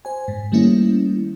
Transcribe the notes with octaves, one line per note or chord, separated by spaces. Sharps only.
C5 G#5
G#2
D#3 G3 A3 A#3 C#4 E4